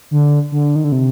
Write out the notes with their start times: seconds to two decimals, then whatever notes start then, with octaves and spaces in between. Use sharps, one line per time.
0.11 D3
0.52 D3
0.76 D#3
0.84 D3
0.92 C3